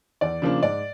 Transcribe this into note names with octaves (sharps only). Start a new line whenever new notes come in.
E2 D5
C#3 F3 A#3 D4
G#2 D5